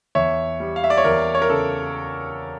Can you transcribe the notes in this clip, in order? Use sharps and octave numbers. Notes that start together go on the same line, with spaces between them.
E2 C#5 E5
G3
F5
E5
D5
C#5
E2 A#4
C#5
A#4
C#3 A4